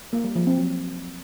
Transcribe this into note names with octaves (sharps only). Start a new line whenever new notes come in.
A#3
G3
F3
C4
F#3